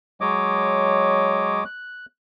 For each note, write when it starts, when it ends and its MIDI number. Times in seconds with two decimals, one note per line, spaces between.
0.21 1.64 54
0.21 1.64 56
0.21 1.64 73
0.21 1.64 75
0.21 1.64 86
1.65 2.06 90